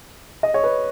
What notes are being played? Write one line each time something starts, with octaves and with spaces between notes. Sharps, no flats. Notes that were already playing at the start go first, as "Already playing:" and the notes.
D#5
C#5
B4